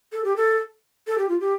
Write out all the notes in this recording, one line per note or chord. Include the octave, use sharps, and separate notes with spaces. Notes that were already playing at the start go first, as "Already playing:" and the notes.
A4
G4
A4
A4
G4
F4
G4